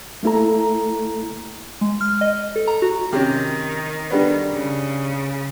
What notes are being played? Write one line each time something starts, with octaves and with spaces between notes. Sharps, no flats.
A3 A#3 E4 A4 A#5
G#3
F6
D#5
A4
A#5
F#4
C3 D#3 C#4
D3 G3 B3
C#3